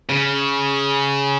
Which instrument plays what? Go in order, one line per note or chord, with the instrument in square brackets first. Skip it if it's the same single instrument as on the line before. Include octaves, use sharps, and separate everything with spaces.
[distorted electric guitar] C#3